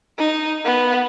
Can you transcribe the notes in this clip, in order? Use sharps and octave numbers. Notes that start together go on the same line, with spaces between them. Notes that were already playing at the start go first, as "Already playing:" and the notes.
D#4
B3